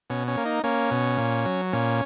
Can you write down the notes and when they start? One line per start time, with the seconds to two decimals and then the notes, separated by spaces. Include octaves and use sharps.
0.10 B2 C#4
0.28 C#4
0.37 A#3
0.45 D#4
0.64 A#3 C#4
0.91 B2
1.18 A#2
1.46 F#3
1.73 A#2 C#4